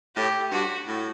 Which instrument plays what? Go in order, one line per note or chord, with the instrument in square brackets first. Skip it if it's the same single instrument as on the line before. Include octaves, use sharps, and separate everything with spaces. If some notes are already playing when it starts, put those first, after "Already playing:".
[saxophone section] A2 [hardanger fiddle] G4
[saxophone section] G2 [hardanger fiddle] F#4
[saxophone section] A2